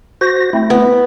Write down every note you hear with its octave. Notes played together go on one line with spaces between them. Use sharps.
F#4 C5 A#6
A3 C4 E4
B3